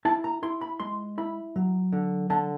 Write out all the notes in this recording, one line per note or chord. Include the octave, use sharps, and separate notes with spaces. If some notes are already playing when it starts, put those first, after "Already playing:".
E4 A5
A#5
E4 C6
B5
G#3 C6
E4 B5
F#3
D3
D3 A5